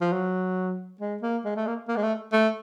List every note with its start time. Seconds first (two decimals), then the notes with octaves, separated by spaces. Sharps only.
0.01 F3
0.12 F#3
1.00 G#3
1.22 A#3
1.45 G#3
1.56 A3
1.67 A#3
1.88 A#3
1.97 G#3
2.03 A3
2.33 A3